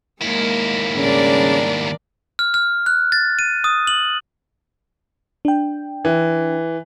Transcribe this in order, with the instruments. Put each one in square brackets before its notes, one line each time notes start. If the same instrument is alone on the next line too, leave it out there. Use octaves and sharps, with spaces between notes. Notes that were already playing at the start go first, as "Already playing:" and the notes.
[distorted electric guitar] D#2 E4 [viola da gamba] G#3 A#3 A#4
[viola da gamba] G#2 G3 D4 [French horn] C#3 [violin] A#4 D5
[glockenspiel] F6
F6
F#6
A6
D#7
D#6
F#7
[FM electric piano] D4 G5
[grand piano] E3